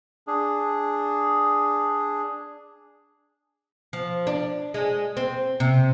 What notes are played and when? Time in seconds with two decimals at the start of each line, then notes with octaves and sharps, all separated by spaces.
0.27 D4 G#4
3.93 F3
4.27 D4
4.74 G#3
5.17 C4
5.60 C3